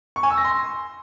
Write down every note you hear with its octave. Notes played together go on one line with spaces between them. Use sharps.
C#6
G#5
E6
A#6
C6